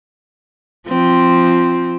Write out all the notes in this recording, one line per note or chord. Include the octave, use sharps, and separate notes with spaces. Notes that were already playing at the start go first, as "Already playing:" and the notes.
F3 C4